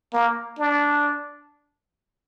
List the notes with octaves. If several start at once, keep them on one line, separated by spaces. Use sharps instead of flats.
A#3
D4